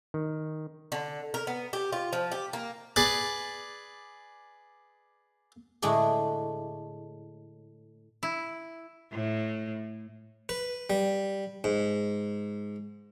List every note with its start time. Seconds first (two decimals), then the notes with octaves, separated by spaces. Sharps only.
0.14 D#3
0.92 D3
1.34 A#4
1.47 B3
1.73 G4
1.92 F4
2.13 F3
2.32 G4
2.53 A#3
2.96 G#4 B4 D5
5.82 A2 D3 G#3 D4 G#4
8.23 E4
9.11 A2
10.49 B4
10.90 G3
11.64 G#2